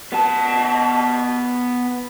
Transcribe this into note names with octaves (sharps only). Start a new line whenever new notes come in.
B3 A5